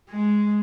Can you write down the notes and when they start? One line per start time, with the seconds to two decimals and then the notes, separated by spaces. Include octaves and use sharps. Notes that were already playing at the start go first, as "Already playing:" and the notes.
0.10 G#3